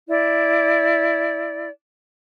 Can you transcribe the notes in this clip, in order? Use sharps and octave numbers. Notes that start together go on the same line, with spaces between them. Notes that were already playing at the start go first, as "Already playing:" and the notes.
E4 D5